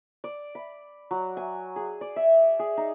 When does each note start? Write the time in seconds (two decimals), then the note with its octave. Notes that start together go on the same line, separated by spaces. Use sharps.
0.24 D5
0.55 B5
1.11 F#3
1.37 G#5
1.76 G#4
2.01 D5
2.16 E5
2.59 G#4
2.77 D#4